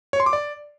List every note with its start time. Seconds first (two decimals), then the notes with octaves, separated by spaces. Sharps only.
0.13 C#5
0.20 C6
0.26 D6
0.33 D5